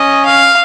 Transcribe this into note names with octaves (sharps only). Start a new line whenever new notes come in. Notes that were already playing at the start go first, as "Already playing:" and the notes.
Already playing: C#4 D#5
F5